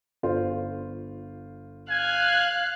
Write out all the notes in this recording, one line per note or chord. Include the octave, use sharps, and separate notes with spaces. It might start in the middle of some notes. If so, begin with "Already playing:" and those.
G1 F4 C5
F5 G#5 F#6